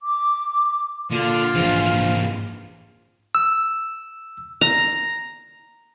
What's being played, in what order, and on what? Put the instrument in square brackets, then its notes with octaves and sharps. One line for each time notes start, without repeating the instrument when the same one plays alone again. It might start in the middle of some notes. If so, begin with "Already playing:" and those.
[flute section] D6
[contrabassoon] A#2 [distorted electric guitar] D3 [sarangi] F4
[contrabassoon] A#1 [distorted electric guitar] G#2 E3
[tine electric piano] E6
[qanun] A#5